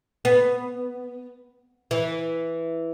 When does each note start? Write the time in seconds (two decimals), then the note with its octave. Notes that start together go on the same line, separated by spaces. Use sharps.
0.25 B3
1.91 E3